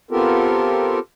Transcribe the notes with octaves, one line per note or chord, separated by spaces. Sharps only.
B3 C4 F4 G4 A4 A#4